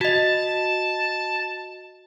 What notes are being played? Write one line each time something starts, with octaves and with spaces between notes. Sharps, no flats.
F#4 D#5 A5